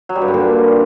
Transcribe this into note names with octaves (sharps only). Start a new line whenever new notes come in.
F#3
G3
G2
D3
A#2